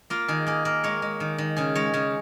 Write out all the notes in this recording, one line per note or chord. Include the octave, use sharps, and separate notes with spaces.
A#3 F4
D#3 G#4
A#3 G#4
A#3 A#4
G#3 C#5
G#3
D#3
D#3
C#3 G#4
G#3 C#5
C#3 G#4